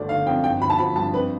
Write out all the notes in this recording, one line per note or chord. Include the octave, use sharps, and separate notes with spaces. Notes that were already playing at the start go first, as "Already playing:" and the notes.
Already playing: G1 A3 D5
D3 F5
F2 G5
G1 G5
G1 B5
A5
F3 B5
G2 A5
F2 B4